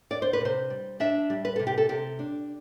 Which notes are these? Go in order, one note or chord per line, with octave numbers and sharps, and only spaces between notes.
D4 D5
C5
B4
C3 C5
G3
D4 E5
G3
B4
C3 A4
G4
A4
C3 G4
D4